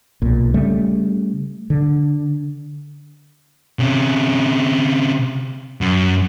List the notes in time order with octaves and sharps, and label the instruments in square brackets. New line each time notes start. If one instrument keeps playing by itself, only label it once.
[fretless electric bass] B1 A#2
C#3 G3 A3
D3
[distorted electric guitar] C3 C#4
F#2